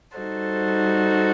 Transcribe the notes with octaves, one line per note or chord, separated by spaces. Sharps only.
G3 D#4 F#4 A4 C5